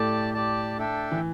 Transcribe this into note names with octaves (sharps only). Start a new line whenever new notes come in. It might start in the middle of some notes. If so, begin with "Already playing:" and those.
Already playing: A2 A3 G4 D5 A5
G4 D5 A5
D4 A4 E5 G5
E3